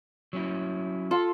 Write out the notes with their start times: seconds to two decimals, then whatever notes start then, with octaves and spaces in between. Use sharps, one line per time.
0.33 F#3 C#4 E4
1.11 F4 A4